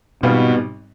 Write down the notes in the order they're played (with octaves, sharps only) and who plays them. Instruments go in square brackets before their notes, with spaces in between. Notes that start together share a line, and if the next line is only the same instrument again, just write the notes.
[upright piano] G#1 G#2 G3 B3 F4 [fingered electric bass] B2